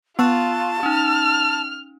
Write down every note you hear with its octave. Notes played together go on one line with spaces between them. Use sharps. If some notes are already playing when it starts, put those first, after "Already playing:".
B3 F4 A5 C#6 E6 F#6
C#4 D#4 F6